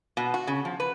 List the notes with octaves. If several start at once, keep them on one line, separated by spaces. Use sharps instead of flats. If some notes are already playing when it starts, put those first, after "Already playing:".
B2
F#4
C#3
F3
B4